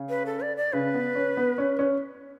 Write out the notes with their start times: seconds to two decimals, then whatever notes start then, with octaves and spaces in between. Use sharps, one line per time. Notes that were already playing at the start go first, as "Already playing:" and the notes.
Already playing: C#3
0.09 B4
0.26 A4
0.41 D5
0.57 D5
0.73 C#3 B4
0.94 B3
1.15 C#4
1.37 B3
1.58 C#4
1.79 C#4